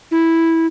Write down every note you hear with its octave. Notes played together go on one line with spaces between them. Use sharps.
E4